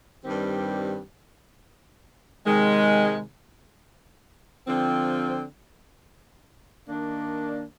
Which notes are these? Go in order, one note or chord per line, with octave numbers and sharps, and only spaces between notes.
G2 D#3 G3 C4 G4
C3 D#3 G#3
D3 F3 C4
D#3 A#3 D4